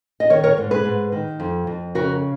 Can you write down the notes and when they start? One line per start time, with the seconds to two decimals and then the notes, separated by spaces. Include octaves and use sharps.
0.20 D#5
0.30 D#3 A#4 C#5
0.43 A#4 C#5
0.58 G#2
0.71 G#4 B4
0.85 G#2
1.12 D#3
1.40 F2
1.67 F2
1.95 C#3 F#4 A#4